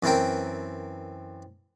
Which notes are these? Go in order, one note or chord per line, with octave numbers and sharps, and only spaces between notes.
F#2 E3 C4 A#4 G5